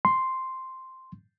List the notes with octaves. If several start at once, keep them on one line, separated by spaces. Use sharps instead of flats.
C6